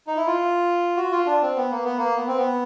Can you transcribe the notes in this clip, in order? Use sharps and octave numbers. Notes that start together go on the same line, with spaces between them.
D#4
E4
F4
F#4
F4
D4
C4
B3
A#3
B3
A#3
B3
C4
B3